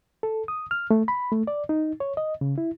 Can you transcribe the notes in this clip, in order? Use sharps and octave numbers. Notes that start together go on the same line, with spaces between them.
A4
D#6
F6
A3
B5
A3
D5
D#4
C#5
D#5
C#3
E4